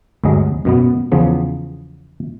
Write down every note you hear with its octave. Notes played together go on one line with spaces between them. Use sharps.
D2 G2 F#3 G#3 D#5
F#2 B2 B3
E2 C#3 F3 B3